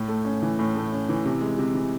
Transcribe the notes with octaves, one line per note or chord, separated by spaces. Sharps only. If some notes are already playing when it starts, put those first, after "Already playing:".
Already playing: A2
A3
C#4
E3
A2
A3
C#4
E3
C3
G#3
C3
E3